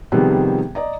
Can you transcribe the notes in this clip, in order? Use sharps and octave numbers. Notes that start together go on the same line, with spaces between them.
C3 D#3 F3 G3 B3 G#4
D5 D#5 A#5